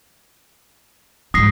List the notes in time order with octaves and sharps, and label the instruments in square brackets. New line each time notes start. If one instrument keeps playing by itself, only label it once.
[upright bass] G#2 F3 [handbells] D#6 A#6 C7